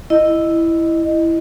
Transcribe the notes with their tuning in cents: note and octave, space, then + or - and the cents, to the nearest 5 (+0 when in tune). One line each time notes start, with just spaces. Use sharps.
E4 +0 D#5 -10